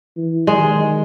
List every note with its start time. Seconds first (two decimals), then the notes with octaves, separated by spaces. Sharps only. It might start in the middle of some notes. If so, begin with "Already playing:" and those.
0.17 E3
0.47 D#3 G#3